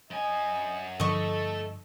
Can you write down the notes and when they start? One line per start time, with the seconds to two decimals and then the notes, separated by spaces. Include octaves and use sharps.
0.11 F#2 D#5 G#5
1.00 G2 D3 F3 A3 A4 D#5 C#6